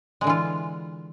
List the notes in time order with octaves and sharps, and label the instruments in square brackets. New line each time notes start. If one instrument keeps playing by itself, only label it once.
[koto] G#3
D3
E3
F4